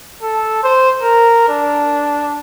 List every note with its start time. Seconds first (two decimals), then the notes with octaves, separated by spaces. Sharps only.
0.22 A4
0.64 C5
1.02 A#4
1.49 D4